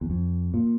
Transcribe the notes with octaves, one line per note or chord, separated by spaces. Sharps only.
E2
F2
A#2